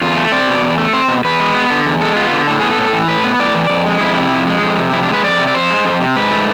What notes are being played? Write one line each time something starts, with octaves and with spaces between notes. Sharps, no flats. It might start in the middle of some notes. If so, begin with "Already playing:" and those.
E2 F4
A3
C4 D5
B2
E2
A3
C4 C5
B2
E2 B4
G#3
B3
D3
E2
G#3 A4
B3 F4
D3
A2 A4
B3 G#4
A4
A2
E3
A2 B4
B3
A2 D5
E3
F2
G#3
F2 E4
C3
F2
G#3
F2
C3
F2 E4
D4
G#3 B4
F2 D5
C3
D5
F2 C5
G#3
F2
C3
G#2 B4
A3